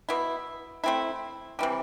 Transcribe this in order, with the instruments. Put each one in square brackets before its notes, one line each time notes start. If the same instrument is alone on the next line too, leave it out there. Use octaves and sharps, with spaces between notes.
[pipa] B2 B3 E4
A3 C4 E4
C3 E3 G3